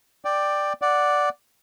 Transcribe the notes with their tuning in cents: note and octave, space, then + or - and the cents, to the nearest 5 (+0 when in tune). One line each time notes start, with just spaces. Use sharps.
D5 +10 G5 +0
D5 +0 F#5 +0